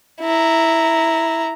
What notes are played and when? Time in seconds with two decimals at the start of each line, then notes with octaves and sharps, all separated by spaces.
0.21 E4 A#5